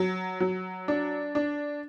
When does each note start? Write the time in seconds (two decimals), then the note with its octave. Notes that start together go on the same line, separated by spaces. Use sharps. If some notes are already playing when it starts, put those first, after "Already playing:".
Already playing: F#3
0.40 F#3
0.88 D4
1.35 D4